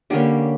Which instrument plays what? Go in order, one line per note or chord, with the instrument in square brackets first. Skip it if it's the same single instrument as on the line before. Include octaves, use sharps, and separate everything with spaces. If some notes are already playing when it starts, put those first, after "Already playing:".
[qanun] D3 G3 A#3 C#4 G4